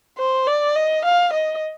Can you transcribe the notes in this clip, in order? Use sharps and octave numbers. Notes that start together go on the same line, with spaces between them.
C5
D5
D#5
F5
D#5